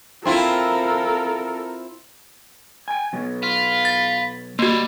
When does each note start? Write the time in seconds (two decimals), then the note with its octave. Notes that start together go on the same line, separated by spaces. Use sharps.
0.25 C4 E4 F4 A4 A#4
2.88 G5 G#5
3.13 B2 F#3
3.43 F4 B5
3.85 A6
4.59 D2 G3 A#3 F#4